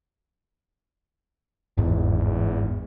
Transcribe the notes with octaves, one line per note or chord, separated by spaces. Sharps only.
G1 E2 G#2